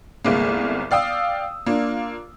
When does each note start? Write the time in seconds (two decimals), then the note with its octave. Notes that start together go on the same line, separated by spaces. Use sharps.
0.25 G1 C2 G#3 A#3
0.91 D5 F5 G5 D#6 E6
1.66 A#3 D4 F4